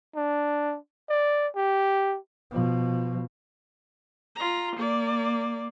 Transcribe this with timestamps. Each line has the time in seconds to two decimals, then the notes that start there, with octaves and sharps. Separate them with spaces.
0.15 D4
1.09 D5
1.56 G4
2.51 B2 F3
4.36 F4 A#5
4.76 A#3 D5